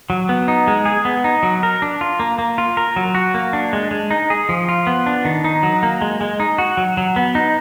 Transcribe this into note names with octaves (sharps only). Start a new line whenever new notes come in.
F#3
B3
D#4
G#3
G#4
B3
D#4
F#3
A#4
D4
F4
A#3
A#3
F4
A#4
F#3
F#4
A#3
D4
G#3
G#3
D#4
G#4
F3
F4
B3
D4
D#3
D#4
F#3
A#3
G#3
G#3
D#4
F#4
F#3
F#3
B3
D#4